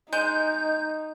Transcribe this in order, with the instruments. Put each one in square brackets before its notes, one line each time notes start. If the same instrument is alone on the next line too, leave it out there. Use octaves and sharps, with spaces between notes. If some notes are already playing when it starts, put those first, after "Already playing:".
[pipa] G#3 [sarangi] D#4 [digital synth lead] G6